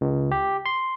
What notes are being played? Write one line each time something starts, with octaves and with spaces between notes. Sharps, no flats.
C#2
G4
C6